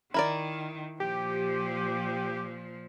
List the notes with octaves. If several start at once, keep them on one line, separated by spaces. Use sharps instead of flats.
D#3 E4 A#4 D5
A#2 F3 G4